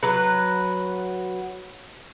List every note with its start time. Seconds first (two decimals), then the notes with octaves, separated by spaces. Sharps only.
0.03 F#3 B4